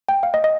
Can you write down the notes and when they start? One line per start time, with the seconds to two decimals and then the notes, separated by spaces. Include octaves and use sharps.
0.09 G5
0.23 F5
0.34 D#5
0.44 D#5